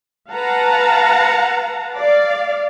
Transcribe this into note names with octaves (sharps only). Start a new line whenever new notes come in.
B4 F5 F#5 A5 A#5
D5 F5